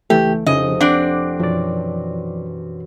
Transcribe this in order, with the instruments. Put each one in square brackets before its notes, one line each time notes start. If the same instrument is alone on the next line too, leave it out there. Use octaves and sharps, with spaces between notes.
[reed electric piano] C#2 E3 A3 [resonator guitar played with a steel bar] G4
[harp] F1 E4 E7 [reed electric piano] C#3 F3 G#4 [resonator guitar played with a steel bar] D#5
[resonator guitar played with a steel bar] C4 D4 [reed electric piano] F#5 D6
[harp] F#2 B2 E3 [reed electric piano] F3 D5